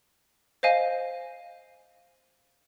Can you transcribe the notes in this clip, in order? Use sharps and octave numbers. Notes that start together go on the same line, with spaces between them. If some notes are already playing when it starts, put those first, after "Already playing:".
C5 D#5 F5 G#5